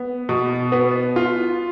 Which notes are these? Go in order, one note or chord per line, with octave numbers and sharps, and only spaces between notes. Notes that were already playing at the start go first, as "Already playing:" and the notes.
Already playing: B3
B2
B3
F4